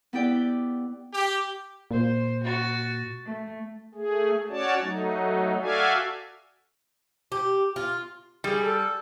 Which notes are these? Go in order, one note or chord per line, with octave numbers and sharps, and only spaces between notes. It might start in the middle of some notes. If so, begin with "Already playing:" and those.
B3 E4 G4 D5 G5
G4
A#2 C5
F#4 A6
A3
A3 G#4
C#4 F#4 C#5 D5 A5
F#3 A3 D#4
F#4 A4 D5 E5 F5 G#5
G4
F4
G3 G#4
A4